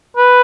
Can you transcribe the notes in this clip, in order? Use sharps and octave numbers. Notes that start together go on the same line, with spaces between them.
B4